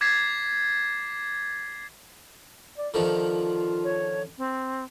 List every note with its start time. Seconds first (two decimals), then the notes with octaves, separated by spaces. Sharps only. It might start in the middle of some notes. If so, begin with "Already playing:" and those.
0.01 D6 G#6 A6 B6 C7
2.78 D5
2.94 D3 D#3 F3 F4
3.84 C#5
4.38 C4